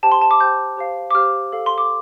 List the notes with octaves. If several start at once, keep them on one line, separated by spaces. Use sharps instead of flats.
G4 C5 G5 A5
C6
A5
D6
G4 C5 G5 G6
G4 C5 F5
D6
G4 C5 F5 F6
A4 F5
C6
D6